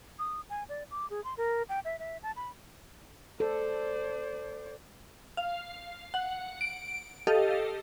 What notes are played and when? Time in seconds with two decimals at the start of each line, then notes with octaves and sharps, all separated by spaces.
0.19 D#6
0.50 G#5
0.69 D5
0.91 D6
1.10 G#4
1.24 C6
1.37 A#4
1.69 G5
1.85 E5
1.99 E5
2.23 A5
2.36 B5
3.40 A4 C5 D5
5.37 F5
6.14 F#5
6.61 D7
7.27 G4 A4 D#5 F5